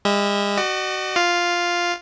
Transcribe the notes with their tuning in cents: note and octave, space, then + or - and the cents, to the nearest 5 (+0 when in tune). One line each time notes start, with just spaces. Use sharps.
G#3 -45 E5 -30
F#4 +25 D#5 -45
F4 +0 F5 +0